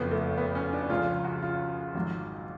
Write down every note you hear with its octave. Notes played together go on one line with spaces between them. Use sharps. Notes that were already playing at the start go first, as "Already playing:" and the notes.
Already playing: F#1 F2 F3 B3
A3
B3
C#4
D4
C#2 C#3 F3 F4
F#4
F4
G#1 G#2 F#3